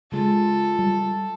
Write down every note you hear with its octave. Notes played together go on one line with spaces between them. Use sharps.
C#3 G#3 F4 A4
G3